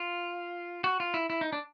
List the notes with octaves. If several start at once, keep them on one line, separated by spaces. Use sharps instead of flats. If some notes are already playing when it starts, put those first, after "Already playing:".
Already playing: F4
F#4
F4
E4
E4
D#4
D4